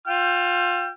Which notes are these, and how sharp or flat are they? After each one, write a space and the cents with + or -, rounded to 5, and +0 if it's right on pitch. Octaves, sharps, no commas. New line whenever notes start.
F4 +25 G5 +0 E6 +45